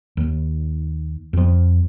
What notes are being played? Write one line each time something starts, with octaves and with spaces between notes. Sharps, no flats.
D#2
F2 F3